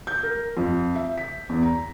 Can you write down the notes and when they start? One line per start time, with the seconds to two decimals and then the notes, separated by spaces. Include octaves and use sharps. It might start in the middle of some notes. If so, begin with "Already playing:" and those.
0.07 G6
0.23 A#4
0.57 F2
0.95 E5
1.18 B6
1.49 E2
1.63 A#5